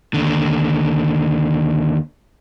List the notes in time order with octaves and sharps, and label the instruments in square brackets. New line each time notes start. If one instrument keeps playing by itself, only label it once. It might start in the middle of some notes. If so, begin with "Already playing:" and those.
[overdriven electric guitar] D#2 D3